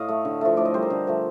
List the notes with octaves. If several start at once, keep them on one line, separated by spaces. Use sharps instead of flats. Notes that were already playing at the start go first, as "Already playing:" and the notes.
Already playing: A2 D#5 F5
A3
D3
F3 A3
A2 D5
D#5
G3 C5
A#4
D3
F3 A3